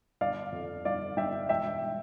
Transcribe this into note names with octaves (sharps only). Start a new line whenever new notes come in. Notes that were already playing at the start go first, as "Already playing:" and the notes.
G1 D5 F5
F2
G1 D5 F5
G1 E5 G5
E1 E5 G5